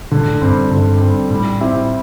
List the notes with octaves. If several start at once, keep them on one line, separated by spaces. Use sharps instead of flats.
A#2 D3
A2
G2 G3 C4
G2 D3
G3 C4
A2 G3
C4 E4 G4